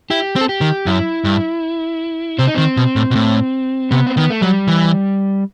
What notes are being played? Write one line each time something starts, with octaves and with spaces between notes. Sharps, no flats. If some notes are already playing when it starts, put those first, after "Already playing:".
E4 G4
C4
A4
G4
D#3
F#2 E4
G2
C3 C4
D#4
D#3 C4
B2
A2
B2
A2
C3 B3
C4
D#3 B3
A3
F#3 G3
E3